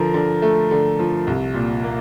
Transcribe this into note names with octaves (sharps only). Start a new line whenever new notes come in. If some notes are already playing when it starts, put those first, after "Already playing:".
Already playing: D3 F3 A#4
D3
A3
D3
F3
C2
A#2
A#3